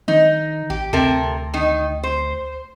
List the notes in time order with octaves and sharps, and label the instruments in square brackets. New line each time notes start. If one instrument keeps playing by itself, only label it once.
[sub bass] D#3 [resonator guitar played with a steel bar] D#4
[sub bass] A1 [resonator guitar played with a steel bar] G4
[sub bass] D2 [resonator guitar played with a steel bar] C3 A4 A#4
[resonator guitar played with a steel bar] D#3 D#4
C5